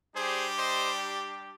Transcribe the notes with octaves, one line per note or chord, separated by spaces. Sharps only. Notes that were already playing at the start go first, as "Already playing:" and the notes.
G3 D4 G4 G#4 C5
C5 D#5